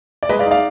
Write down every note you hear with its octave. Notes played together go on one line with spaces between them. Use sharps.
D5
G#3 B4 D#5
D5 F5
D#4
D5 F5